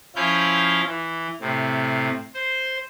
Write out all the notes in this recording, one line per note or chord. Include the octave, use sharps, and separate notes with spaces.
F3 C#4 E4 F4 F5 G6
E3
A2 C3
C5